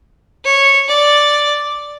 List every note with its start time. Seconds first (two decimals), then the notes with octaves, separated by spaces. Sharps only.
0.45 C#5
0.88 D5